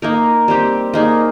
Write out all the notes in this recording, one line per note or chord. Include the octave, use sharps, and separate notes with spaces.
A#3 D#4 A#4
G3 C4 G4
A#3 D#4 G#4